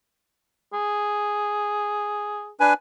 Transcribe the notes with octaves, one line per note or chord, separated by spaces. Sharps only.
G#4
D4 B4 G#5